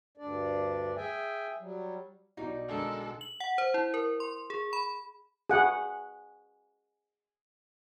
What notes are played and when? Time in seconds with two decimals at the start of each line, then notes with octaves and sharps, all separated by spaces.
0.18 D2 G2 D4 D5
0.96 G#4 E5 G5 G#5
1.58 F#3 G3
2.37 B1 B2 G3 D#4
2.69 D3 G#3 A4 A#4
3.21 F#7
3.40 F#5
3.58 C5
3.74 E4
3.94 A#4
4.20 C6
4.50 G#4
4.73 B5
5.50 G#4 F#5